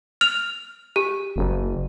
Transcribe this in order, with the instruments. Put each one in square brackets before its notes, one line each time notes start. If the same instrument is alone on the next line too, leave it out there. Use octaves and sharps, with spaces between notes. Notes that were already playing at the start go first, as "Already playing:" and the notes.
[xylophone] F6 F7
G4
[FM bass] F#1